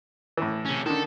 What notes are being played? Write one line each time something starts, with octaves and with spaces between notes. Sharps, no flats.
A2 E3
C3 C#4
D3 D#3 A4